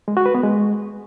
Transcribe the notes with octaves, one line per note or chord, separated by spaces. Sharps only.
G#3
F#4
B4
B3
G#3